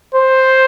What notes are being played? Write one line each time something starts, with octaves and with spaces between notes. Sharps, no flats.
C5